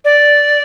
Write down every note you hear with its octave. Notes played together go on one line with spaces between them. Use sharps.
D5